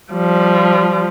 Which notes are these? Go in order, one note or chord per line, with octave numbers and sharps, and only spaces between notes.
F3 G3